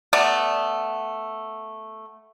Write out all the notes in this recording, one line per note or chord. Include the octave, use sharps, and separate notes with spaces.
A3 B3 D5